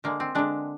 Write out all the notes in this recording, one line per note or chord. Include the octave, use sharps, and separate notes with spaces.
D3 G#3 A#3
C4
D3 G#3 D4